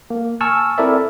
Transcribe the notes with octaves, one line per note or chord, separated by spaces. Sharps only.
A#3
G#5 A5 C#6 E6 F6
C4 E4 A4 A#4 D5 E5